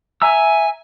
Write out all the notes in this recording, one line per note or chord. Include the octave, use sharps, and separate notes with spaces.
E5 G#5 A#5 E6